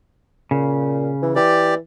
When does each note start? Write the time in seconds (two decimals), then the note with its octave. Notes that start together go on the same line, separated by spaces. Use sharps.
0.51 A#2 C#3
1.22 E3
1.36 E3 G4 D5